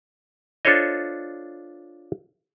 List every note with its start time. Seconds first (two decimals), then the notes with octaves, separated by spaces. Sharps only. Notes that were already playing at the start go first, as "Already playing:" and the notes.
0.65 D4 F4 A4 C5 C#5 D#5